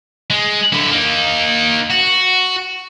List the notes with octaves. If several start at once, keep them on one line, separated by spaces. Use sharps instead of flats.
G#3
D3 E4
A#3 D#4
F#4